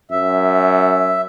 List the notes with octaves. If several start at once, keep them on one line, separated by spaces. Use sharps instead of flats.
F#2 E5